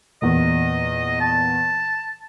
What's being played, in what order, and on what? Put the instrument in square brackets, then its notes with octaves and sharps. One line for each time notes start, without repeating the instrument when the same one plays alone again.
[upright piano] E2 A#2 [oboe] D#5
[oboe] A5